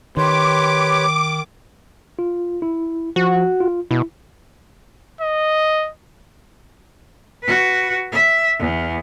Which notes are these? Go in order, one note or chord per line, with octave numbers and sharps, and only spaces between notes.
D#3 G4 B4 C#5 C6 D6
F4
E4
F3 F#4
F4
B2 E4
D#5
F#4 B4
E5
E2